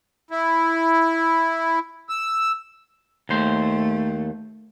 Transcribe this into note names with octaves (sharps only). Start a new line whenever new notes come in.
E4
E6
D#2 A3 C5